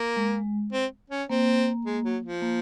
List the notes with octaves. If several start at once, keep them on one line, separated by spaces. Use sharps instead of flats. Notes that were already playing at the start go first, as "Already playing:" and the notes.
Already playing: A#3
G#3
C4
C#4
A#3 C4
G#3
F#3
F3
A#3